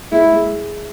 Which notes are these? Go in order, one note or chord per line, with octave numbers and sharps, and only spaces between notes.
G#3 E4
G#3